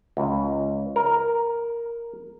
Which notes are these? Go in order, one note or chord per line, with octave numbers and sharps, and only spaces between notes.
C#2
A#4